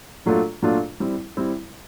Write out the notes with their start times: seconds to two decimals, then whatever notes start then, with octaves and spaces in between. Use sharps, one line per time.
0.26 A#2 F#3 A3 D4 F4
0.62 A#2 F#3 A3 D4 F4
1.00 G3 C4 E4
1.37 G3 C4 E4